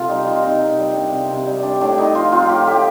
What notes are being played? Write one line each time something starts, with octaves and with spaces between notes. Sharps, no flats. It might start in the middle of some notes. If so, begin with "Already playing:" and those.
Already playing: C3 A#3 F4 A4
G3 D#4
A#3 F4
C3 D#4
C3
G3
D4
C3
C3
G3
D4
A2 D4
A2 D#4
F3 F4
C4 F4
A2 G4
A2 G4